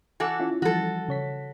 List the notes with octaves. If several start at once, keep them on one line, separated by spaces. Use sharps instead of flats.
E3 F#4 A4 G#5 D6 F#6
C#4 E4 F4
E3 F3 G3 F#4 A4
C#3 C#5 B6